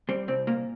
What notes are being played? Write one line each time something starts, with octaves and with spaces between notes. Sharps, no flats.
G3 C4
C2 C4
A#2 A#3